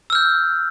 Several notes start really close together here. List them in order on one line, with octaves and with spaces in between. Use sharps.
E6 F6 G6